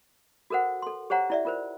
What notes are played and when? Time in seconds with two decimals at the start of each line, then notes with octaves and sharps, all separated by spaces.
0.50 F#4 A4 A#4 C5 F#5
0.82 A4 C6
1.10 G4 C5 C#5 F#5 A#5
1.30 E4 D5 E5
1.45 F4 A#4 C5